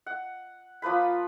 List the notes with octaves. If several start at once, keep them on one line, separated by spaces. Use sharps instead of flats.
F#5
F3 A#3 B4 B5